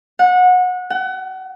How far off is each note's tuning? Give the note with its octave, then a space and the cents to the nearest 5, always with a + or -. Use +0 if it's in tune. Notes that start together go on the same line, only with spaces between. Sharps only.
F#5 -25
F#5 +30